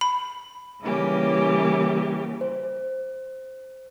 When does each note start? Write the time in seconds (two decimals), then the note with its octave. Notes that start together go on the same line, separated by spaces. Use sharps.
0.01 B5
0.82 C#3 E3 G3 A#3 C#4 G4
2.41 C5